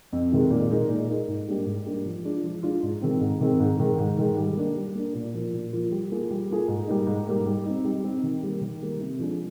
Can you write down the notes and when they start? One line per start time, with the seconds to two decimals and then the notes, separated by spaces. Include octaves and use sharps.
0.12 F2
0.32 C3 D#3 G#3
0.51 A#2
0.70 G#3 D#4 A#4
0.89 A#2
1.08 G#3 D#4 A#4
1.28 G#2
1.47 G3 A#3 D4 G4
1.66 G#2
1.85 G3 A#3 D4 G4
2.05 F3
2.24 G#3 D4 F4
2.43 F3
2.63 G#3 D4 F4
2.83 G#2
3.02 D#3 G#3 C4
3.21 G#2
3.41 D#3 G#3 C4
3.60 G#2
3.80 D#3 G#3
3.98 G#2
4.18 D#3 G#3
4.37 G3
4.57 A#3 D4
4.76 G3
4.95 A#3 D4
5.14 A#2
5.34 F3 A#3 F4
5.53 A#2
5.73 F3 A#3 F4
5.91 G3
6.11 A#3 F4 G#4
6.31 G3
6.50 A#3 F4 G#4
6.68 G#2
6.87 G3 A#3 D#4
7.07 G#2
7.27 G3 A#3 D#4
7.46 G3
7.65 C4 D#4
7.84 G3
8.04 C4 D#4
8.23 D#3
8.43 G3 A#3
8.61 D#3
8.81 G3 A#3
9.00 C3
9.19 F3 G#3 D4 G#4